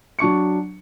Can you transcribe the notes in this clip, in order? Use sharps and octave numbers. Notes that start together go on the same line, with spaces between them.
F#3 D4 C#6 C#7